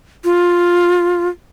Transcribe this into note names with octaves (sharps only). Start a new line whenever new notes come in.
F4